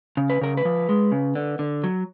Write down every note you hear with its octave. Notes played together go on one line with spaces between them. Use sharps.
C#3
B4
C#3 A#4
B4
F3
G#3
C#3
D3
D3
F#3